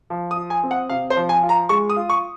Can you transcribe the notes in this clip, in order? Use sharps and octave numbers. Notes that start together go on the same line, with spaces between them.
F3
D#6
F4
G#5
C4
F#5
C3 F5
C5
F3
G#5
F4
A#5
G#3 C#6
D#6
F4
C#6